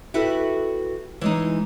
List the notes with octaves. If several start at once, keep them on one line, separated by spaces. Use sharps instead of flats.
E4 F#4 G4 A4 B4
E3 G#3 D#4